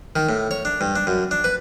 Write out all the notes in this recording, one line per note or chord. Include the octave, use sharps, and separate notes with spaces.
D#3
A2
C#5
D4
G2
D4
F#2
D4
B4